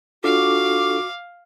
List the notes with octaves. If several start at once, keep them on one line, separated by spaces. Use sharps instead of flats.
D4 F4 F#4 A4 F5 D6